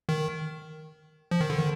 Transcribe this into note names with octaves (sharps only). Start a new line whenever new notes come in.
D#3
F3
D#3
D3
D#3